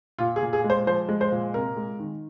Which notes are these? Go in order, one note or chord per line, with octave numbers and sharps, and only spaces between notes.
A#2 F4
G#4
A#2
G#4
G#3
C5
F3 C5
G#3
C5
A#2
C3 A#4
G#3
D#3